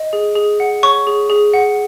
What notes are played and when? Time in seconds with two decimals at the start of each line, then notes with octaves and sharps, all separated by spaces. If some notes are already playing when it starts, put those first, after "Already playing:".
Already playing: D#5
0.13 G#4
0.36 G#4
0.60 F#5
0.83 C#5 C#6
1.07 G#4
1.30 G#4
1.54 F#5